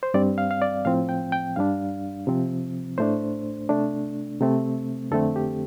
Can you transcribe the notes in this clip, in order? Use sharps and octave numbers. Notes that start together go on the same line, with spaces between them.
C5
G2 G3 C4 D5
F5
F5
D5
A2 F3 C4 F5
G5
G5
G2 G3 D4 F5
C3 F3 C4
A2 A3 D4 C5
C3 A3 D4
C3 A3 C4
F2 D3 A3 C4 A4
G4